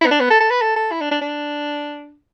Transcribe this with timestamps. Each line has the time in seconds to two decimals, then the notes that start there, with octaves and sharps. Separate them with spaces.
0.01 E4
0.06 B3
0.11 D4
0.20 B3
0.30 A4
0.40 A4
0.51 B4
0.61 A4
0.76 A4
0.91 E4
1.01 D4
1.11 D4
1.21 D4